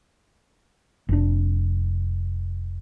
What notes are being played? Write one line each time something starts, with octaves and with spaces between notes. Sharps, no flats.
F1 D4